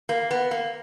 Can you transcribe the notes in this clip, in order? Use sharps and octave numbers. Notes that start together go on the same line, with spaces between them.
A#3
B3
A#3